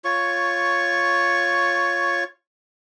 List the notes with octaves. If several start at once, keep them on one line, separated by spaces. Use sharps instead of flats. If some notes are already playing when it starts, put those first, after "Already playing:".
F4 C#5 C#6